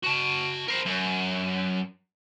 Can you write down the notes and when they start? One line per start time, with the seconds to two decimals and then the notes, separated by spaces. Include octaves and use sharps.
0.04 F#4 A5
0.68 A#4 C5
0.86 F#2